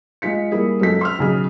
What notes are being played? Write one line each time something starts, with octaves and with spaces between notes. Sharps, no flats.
G#3 F4 B6 C#7
G3 A#3 E4 G#4
C#2 F#2 C#4 A4 B6
C6 E6 F6
B1 C#3 G#4